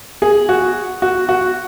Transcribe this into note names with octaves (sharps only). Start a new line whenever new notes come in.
G#4
F#4
F#4
F#4